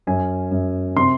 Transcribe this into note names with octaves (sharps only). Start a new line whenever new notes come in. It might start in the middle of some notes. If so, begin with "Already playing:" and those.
F#2 G#5
F#2
C3 C6